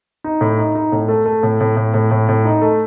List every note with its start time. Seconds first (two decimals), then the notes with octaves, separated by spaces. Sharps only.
0.24 D#4
0.41 A2
0.58 D#4
0.75 D#4
0.92 A2
1.08 A3
1.26 A3
1.43 A2
1.61 A2
1.77 A2
1.94 A2
2.11 A2
2.29 A2
2.45 D#4
2.62 A3